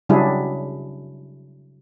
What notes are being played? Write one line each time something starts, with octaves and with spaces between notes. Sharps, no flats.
C#3 F#3 G3 D4 E4 G#4